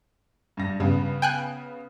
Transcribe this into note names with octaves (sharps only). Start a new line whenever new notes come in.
G2 A#6
G2 C#3 B3
G5 G#5 F#6